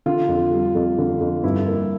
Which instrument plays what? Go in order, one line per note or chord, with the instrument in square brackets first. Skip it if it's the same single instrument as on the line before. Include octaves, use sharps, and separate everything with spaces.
[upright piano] D3 [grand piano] F4
[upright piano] F2
G3
F2
D3
F2
[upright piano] G2 [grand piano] E4
[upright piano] A#3